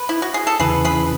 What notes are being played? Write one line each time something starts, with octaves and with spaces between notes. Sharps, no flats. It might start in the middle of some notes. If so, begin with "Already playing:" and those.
Already playing: B4
E4
F#4
G#4
A4
E2 C#3 E3 G#4 B4
G#4 B4